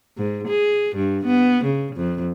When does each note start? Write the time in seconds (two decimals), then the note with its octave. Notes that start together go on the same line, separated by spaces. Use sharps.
0.18 G#2
0.48 G#4
0.95 G2
1.26 B3
1.64 C#3
1.95 F2